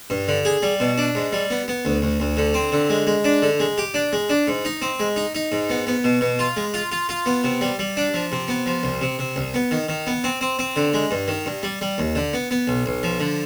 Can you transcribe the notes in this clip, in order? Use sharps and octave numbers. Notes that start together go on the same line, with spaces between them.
G2
D3
G#4
G3
B2
D4
G#2
G3
B3
B3
D2
D2
D2
D3
C4
D3
G#3
G#3
D4
D3
G#3
G4
D4
G#3
D4
G#2
D#4
C4
G#3
D#4
D#4
G#2
B3
B3
B2
B2
F4
G#3
F4
F4
F4
B3
C3
G3
G3
D4
F3
C3
B3
F3
C2
C3
C3
C2
B3
D#3
D#3
B3
C4
C4
C4
D3
G#3
G2
D#3
G2
G3
G3
D#2
D3
B3
B3
B1
B1
F3
D3